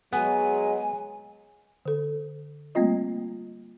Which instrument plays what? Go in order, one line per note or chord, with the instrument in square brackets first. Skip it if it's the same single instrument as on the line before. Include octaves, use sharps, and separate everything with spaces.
[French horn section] F#3 G#3 [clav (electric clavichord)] B3 [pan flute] G#5
[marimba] D3 A4
G3 A3 A#3 C4 F4 D#5